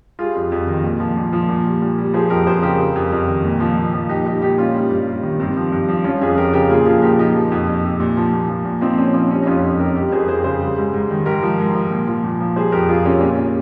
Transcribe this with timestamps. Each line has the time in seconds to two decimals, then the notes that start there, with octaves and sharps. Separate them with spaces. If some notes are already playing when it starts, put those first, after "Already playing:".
0.19 G3 F4 G#4
0.35 F2
0.52 F2
0.67 D#3
0.84 A#2
1.00 F3
1.17 A#2
1.33 F3
1.49 A#2
1.65 G3
1.82 A#2
1.98 G3
2.14 F3 G#4 C5
2.30 F2 G4 A#4
2.47 F2 G#4 C5
2.63 C#3 G4 A#4
2.79 G3
2.95 F2
3.12 F2
3.28 D#3
3.44 A#2
3.60 F3
3.77 A#2
3.93 F3
4.09 A#2 D#4 G4
4.26 G3 D#4 G4
4.42 A#2 D#4 G4
4.58 G3 C#4 F4
4.74 G3
4.90 G2
5.07 G2
5.23 D#3
5.40 G2 C4 D#4
5.57 F3
5.72 G2
5.89 F3
6.04 F3 C#4 F4
6.21 F2 F4 G#4
6.37 F2 G4 A#4
6.53 C#3 G4 A#4
6.70 A#2 F4 G#4
6.86 F3 F4 G#4
7.02 A#2 G4 A#4
7.19 F3 D#4 G4
7.35 F3
7.51 F2
7.68 F2
7.84 C3
8.00 A#2
8.17 F3
8.33 A#2
8.49 F3
8.65 A#2
8.81 F3 C4 D#4
8.98 A#2 C#4
9.14 F3 C#4
9.31 G3 C#4
9.42 D#4
9.47 F2 C#4 F4
9.63 F2
9.79 C3 G4 A#4
9.95 G3 G4 A#4
10.12 F2 G#4 C5
10.28 F2 G#4 C5
10.44 C#3 G#4 C5
10.60 G3
10.77 G#2
10.93 G#2
11.10 D#3
11.25 G#2 G4 A#4
11.42 F3
11.59 G#2
11.74 F3
11.91 A#2
12.07 F3
12.24 A#2
12.40 F3
12.56 G3 G#4 C5
12.72 F2 G4 A#4
12.88 F2 F4 G#4
13.05 C3 C#4 F4
13.21 A#2 C#4
13.38 G3